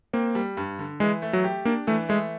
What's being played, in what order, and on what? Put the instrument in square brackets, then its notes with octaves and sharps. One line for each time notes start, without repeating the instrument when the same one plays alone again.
[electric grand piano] A#3 [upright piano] C4
[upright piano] G3
G2
D3
[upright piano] E3 [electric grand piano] G#3
[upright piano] A3
[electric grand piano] F#3
[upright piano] G4
[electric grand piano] A#3 [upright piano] D4
[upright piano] E3 [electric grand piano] A3
[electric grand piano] G#3 [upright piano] A3